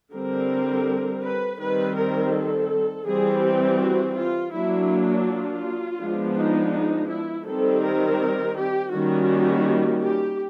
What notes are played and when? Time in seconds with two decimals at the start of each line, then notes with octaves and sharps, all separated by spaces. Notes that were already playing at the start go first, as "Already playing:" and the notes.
0.13 D3 G3 C4 A#4
1.24 B4
1.59 D#3 G3 C4 B4
1.96 A#4
2.33 A4
3.06 E3 G3 C4 G#4
3.43 G4
3.79 F#4
4.16 F4
4.52 F#3 A#3 D4 E4
5.26 F4
6.00 F3 G#3 B3 D4
6.36 D#4
6.72 D#4
7.09 E4
7.45 D#3 G3 C4 A4
7.83 A#4
8.56 G4
8.92 D#3 G3 A#3 C#4 F#4
10.02 G4